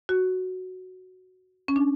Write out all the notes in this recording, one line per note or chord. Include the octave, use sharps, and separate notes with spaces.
F#4
C#4
D4